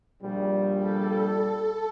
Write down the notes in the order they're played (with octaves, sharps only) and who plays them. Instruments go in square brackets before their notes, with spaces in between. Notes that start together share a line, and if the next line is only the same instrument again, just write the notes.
[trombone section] A#1 G3
[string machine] A4